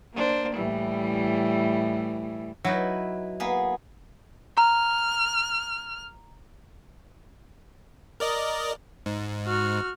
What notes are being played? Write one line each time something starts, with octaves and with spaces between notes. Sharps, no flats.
A#3 D4 C5
A2 E3 G3
F#3 D#4 E4 B4
A#3 B3 G#4
A#5 F6
A#4 D5 D#5
G#2
F#4 F6